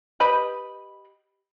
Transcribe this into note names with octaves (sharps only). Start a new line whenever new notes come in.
G4 B4 D#5 B5